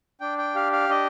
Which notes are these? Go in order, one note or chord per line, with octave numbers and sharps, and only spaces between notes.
D4 G5
G5
G4 F5
F5
D4 D#5